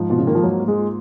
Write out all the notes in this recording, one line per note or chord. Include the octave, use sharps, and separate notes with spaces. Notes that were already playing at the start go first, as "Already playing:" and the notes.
Already playing: G#2 F3
B2 F4
C#3
D#3 A#3
F3
G#2 F#3
A#3
G#3
F4